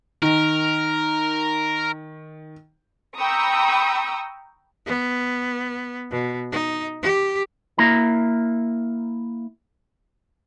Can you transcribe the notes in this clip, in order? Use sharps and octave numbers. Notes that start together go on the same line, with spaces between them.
D#3 A#4
G5 A#5 B5 C#6 D#6 E6
B3
B2
D#4
G4
A#3 E4 A#5